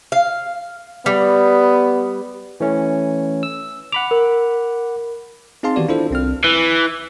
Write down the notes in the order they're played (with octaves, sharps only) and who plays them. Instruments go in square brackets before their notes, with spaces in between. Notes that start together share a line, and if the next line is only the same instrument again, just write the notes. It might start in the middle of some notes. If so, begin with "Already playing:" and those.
[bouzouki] F5
[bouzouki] G3 [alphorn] B3
[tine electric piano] E3 A3 C#4
E6
[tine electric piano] F#5 B5 D6 [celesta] F7
[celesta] A#4
[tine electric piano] C4 D#4 G#4 F5 A5 C6
D#3 E3 B3 F#4 G4 D5
D4 E4 F4 A4 C5
C2 C4 F6
[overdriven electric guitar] E3